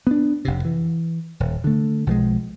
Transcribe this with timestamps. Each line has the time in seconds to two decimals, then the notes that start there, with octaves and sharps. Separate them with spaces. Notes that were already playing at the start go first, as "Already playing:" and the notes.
0.07 B3 D4
0.45 F1 C3
0.65 E3
1.40 D#1
1.64 D3 A3
2.07 B1 F3 G3 G#3